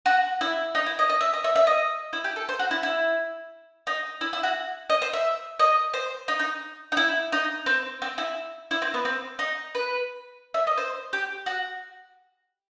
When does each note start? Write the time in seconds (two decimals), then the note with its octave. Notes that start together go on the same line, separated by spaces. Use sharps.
0.06 F#4
0.41 E4
0.75 D#4
0.86 E4
0.99 D#5
1.09 D#5
1.21 E5
1.33 D#5
1.44 E5
1.56 E5
1.67 D#5
2.13 E4
2.24 G4
2.36 A4
2.49 C5
2.59 F#4
2.71 E4
2.83 E4
3.87 D#4
4.21 E4
4.33 E4
4.43 F#4
4.90 D#5
5.02 C5
5.13 E5
5.59 D#5
5.94 C5
6.28 D#4
6.39 D#4
6.92 D#4
6.97 E4
7.32 D#4
7.66 C4
8.02 C4
8.18 E4
8.71 E4
8.82 C4
8.94 B3
9.05 C4
9.39 D#4
9.75 B4
10.54 E5
10.67 D#5
10.78 C5
11.13 G4
11.46 F#4